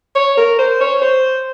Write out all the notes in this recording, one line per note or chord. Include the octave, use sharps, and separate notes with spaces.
C#5
A#4
C5
C#5
C5